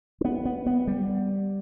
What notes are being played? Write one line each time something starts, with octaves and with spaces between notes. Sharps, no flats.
D4
B3
B3
B3
G3